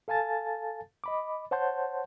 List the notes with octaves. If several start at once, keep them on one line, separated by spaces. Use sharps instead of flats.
A4 F5 G#5 A5 A6
D#5 B5 D6
C5 C#5 F#5 A5 C6 G6